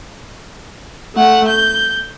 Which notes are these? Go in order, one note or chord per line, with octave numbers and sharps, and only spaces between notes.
A3 F#5
G6